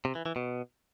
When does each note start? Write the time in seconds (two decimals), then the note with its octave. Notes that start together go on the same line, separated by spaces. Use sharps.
0.05 C3
0.15 E3
0.26 E3
0.36 B2